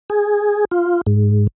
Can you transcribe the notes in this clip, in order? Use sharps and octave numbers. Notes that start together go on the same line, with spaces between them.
G#4
F4
G#2